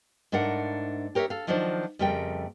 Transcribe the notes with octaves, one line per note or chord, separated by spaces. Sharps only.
G#2 A3 D4 A#4 F#5
G4 A#4 C#5 D5 E5
A4 F5
D#3 F3 F#3 D4 F4 C5
F2 C#3 G3 A3 A#4 G5